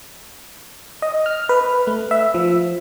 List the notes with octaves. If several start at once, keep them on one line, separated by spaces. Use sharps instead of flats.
D#5
F6
B4
A3
E5
F3